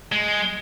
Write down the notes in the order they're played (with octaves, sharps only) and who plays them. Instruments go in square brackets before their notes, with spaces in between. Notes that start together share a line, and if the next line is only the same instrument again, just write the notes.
[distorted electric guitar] G#3